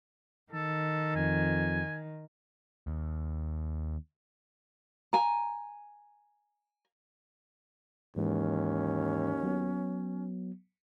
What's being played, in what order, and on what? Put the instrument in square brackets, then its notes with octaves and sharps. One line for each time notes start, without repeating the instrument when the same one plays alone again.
[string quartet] D#3 [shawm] A4
[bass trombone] F2 [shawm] G#5
[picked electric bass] D#2
[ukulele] G#5 A#5
[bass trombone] D#2 [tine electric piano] G#2 E3 G#3 [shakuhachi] C#4
[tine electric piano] F#3 B3